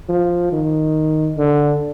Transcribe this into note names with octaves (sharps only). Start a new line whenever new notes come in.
F3
D#3
D3